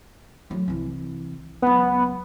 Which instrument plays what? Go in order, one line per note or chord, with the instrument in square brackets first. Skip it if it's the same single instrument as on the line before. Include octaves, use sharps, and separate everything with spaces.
[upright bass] F#3 A3
C2 E3
[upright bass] C#2 F#3 [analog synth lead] B3